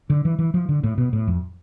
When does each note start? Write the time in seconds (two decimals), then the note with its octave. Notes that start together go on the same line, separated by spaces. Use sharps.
0.10 D3
0.25 E3
0.39 E3
0.54 F3
0.69 D3
0.83 A2
0.98 B2
1.13 A2
1.27 F2